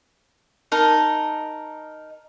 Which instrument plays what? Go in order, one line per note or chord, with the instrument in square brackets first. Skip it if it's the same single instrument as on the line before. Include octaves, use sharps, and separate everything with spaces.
[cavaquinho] D#4 A#4 A5